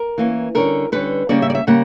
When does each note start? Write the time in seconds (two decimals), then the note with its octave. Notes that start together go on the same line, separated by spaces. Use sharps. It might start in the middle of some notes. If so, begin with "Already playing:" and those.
Already playing: A#4
0.18 E3 A#3 C#4
0.55 D3 G3 C#4 A#4
0.92 D3 G3 C#4 B4
1.29 C#3 G3 A#3 C#4 D5
1.42 E5
1.50 D5
1.55 E5
1.67 C#3 G3 A#3 F#5